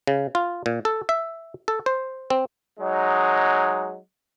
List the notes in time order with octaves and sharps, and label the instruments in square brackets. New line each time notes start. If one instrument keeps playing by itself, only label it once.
[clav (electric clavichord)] C#3
F4
A#2
A4
E5
A4
C5
C4
[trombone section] F#3 G#3 D#4